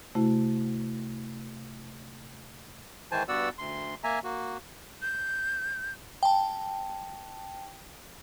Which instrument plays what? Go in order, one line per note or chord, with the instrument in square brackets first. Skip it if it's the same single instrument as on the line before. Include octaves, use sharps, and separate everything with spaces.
[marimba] C3 A3 E4 F#4
[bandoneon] G#2 D#3 E3 C5 G#5 A5
G2 B3 F#4 D5 F#5 E6
D2 C6
A#3 E5 G#5 A#5
A#3 F#4
[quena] G6
[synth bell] G5 A5